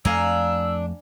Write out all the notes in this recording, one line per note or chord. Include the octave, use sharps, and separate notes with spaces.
F2 A3 D4 F5 G#5 A#5 E6